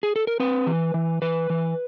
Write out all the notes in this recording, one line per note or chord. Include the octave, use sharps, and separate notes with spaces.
G#4
A4
A#4
C4 B4
E3
E3
E3 B4
E3